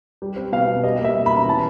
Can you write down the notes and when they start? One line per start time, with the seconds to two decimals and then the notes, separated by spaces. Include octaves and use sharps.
0.22 G3
0.36 C4
0.52 B2 F5
0.68 B2
0.84 G3 D#5
0.99 A#3
1.05 E5
1.15 B2
1.26 C#4 B5
1.37 A#5
1.46 E3 A5